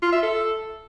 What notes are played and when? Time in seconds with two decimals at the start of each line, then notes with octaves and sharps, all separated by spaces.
0.02 F4
0.12 E5
0.23 A4